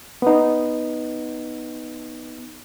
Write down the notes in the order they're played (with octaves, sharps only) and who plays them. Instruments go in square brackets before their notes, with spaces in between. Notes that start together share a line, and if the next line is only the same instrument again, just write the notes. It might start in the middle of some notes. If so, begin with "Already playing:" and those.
[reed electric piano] B3 D#4